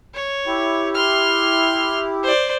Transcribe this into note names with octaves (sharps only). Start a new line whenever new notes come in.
C#5
E4 G4
C6 F6
C5 D5